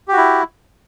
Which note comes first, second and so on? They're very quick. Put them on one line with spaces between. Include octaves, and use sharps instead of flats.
G4 F#4 E4